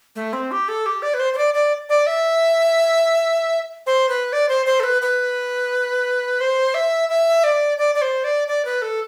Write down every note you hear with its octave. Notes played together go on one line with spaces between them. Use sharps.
A3
C4
G4
A4
G4
D5
B4
C5
C5
D5
D5
D5
E5
C5
B4
D5
C5
C5
A4
B4
B4
C5
E5
E5
D5
D5
D5
C5
D5
D5
B4
A4